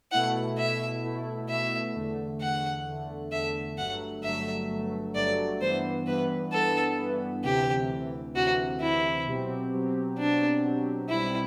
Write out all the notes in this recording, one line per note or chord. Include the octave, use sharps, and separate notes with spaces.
B2 A3 E4 F#5
B2 A3 E4 E5
B2 A3 E4
B2 A3 E4 E5
E2 D3 A3
E2 D3 A3 F#5
E2 D3 A3
E2 D3 A3 E5
G1 G2 F#3 A3 F#5
G1 G2 F#3 A3 E5
G1 G2 F#3 A3
G1 G2 F#3 A3 D5
G2 E3 B3 C5
G2 E3 B3 B4
G2 E3 B3 A4
G2 E3 B3
D2 C3 E3 G4
D2 C3 E3
D2 C3 E3 F#4
D2 C3 E3 E4
B2 F#3 C4 G4
B2 F#3 C4 G4
B2 F#3 C4 D4 G4
B2 F#3 C4 G4
B1 B2 G3 C4 E4